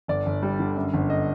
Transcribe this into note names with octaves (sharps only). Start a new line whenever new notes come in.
G1 D5
G1
G3
D3
F#2
G1
D#5